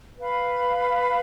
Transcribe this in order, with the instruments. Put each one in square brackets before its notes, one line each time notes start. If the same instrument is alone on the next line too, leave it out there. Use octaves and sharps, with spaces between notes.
[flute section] B4 F5 B5